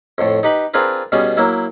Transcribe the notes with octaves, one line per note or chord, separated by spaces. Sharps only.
F2 A2
D#4 G4 B4 B5
C4 D4 F4 G#4 A#4 B4
B2 G3 B3 C#4 G#4
F#3 A#3 E4